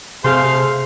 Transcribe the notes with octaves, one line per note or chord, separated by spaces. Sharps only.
C3 A3 G#4 C5 F5 C6